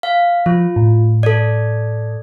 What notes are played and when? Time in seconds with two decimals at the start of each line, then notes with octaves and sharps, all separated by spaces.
0.03 F5
0.46 F3 F4
0.76 A2
1.23 A4 D5